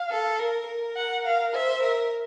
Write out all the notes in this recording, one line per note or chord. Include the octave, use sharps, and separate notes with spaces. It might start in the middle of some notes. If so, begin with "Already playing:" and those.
Already playing: F5
A4
A#4
A#4
F#5
F5
C5 E5
A#4